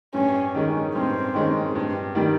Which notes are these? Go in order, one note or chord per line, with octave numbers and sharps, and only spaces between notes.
G2 C#4
D#3 G#3 C#4
G2 C4
D#3 G#3 C#4
G2
D#3 G3